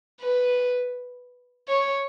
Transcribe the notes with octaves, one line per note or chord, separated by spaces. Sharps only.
B4
C#5